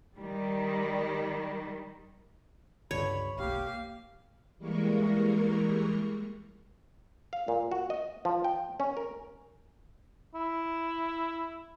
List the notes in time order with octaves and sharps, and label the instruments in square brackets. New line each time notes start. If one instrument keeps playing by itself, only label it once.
[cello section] D#3 G3
[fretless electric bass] C#2 G2 D3 [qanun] C#5 [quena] B5
[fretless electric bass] F1 B1 [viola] A#3 F5 [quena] G4
[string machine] E3 G3 G#3 A#3 A#4 C#6
[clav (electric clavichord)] F5
A#2
F#4
D#5
F3
G5
C#4
A#4
[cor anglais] E4